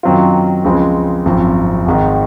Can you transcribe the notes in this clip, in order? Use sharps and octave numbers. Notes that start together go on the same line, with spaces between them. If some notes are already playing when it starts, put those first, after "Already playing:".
F#2 D#3 F#3 C4 F4
C#2 C#3 F3 G#3 C4
G#1 F#2 F3 C4
G#1 G#2 D#3